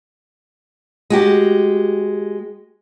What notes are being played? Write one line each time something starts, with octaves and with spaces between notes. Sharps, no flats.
G#3 F#4 G4